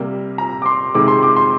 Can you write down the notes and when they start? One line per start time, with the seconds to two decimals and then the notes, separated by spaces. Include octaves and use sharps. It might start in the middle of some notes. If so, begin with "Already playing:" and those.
Already playing: C3 G3 A#3
0.38 A#5
0.62 D6
0.66 C6
0.95 C3 D#3 G#3 D6
1.08 C6
1.23 D6
1.36 C6